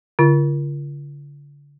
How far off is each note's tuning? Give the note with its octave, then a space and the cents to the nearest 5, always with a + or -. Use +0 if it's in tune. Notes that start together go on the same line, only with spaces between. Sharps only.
D3 -35 F4 -40